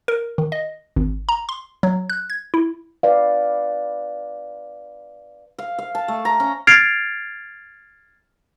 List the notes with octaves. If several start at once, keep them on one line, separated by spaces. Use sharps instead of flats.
A#4
D#3
D#5
G#1
A#5
C6
F#3
F#6
G#6
E4
B4 D5 F5
F5
F5
A5
A3
A#5
C#4
F6 G#6 A6 C7 D7 F7